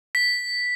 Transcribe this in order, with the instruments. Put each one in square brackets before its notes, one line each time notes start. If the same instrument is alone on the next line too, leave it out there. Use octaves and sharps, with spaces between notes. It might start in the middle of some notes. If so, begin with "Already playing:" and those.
[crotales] B6